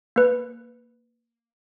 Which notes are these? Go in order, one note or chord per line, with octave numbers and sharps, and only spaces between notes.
A#3 B4